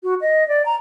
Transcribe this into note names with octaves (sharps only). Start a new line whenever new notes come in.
F#4
D#5
D5
A#5